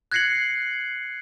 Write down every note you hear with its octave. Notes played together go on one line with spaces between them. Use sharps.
F#6 G#6 A#6 C7 C#7 F#7